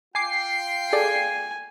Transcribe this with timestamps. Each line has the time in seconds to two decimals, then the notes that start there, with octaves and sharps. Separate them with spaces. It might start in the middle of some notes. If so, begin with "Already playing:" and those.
0.15 F4 G5 G#5 D6 C7
0.93 G#4 A4 D5 G#5